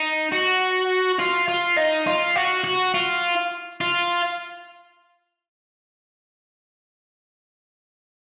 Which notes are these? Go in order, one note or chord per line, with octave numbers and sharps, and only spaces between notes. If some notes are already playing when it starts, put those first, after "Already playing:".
Already playing: D#4
F#4
F4
F4
D#4
F4
F#4
F#4
F4
F4